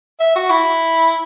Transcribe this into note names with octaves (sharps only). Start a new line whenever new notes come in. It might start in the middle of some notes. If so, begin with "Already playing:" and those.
E5
F#4
E4